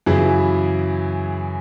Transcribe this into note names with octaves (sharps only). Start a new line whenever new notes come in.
F#2 C#3 E3 E4 G#4